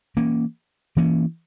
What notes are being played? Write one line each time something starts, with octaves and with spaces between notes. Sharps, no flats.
E3 A#3 C#4
E3 A#3 C#4